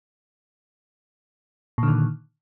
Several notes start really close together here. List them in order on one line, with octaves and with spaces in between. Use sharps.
A#2 D3 D#3